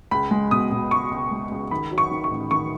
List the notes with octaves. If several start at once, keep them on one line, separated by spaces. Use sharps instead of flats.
C#2 B5
G#3
B2 D#6
B2
C#2 C#6
C#2
G#3
C#2
D#3 B5
F#3
C#6
D#3
C#6
A1
D#3 C#6